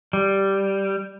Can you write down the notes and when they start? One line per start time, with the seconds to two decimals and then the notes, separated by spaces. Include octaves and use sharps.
0.13 G3